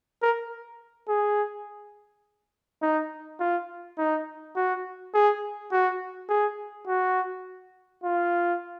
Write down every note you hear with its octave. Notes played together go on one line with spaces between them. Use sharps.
A#4
G#4
D#4
F4
D#4
F#4
G#4
F#4
G#4
F#4
F4